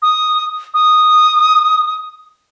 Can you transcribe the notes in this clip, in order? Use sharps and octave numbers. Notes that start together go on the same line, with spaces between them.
D#6
D#6